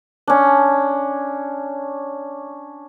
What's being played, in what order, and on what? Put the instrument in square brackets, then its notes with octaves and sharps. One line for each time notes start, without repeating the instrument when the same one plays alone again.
[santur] C#4 D4